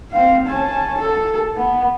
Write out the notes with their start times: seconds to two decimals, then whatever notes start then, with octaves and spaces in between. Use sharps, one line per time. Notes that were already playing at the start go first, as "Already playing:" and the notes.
0.11 C4 F5
0.47 C#4 A5
0.98 A4
1.56 B3